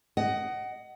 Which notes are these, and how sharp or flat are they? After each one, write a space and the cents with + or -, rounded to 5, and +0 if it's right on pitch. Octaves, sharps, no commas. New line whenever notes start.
D#5 +0 F#5 +25